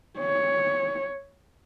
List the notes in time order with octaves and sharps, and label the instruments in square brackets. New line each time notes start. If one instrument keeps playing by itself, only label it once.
[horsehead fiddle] C#5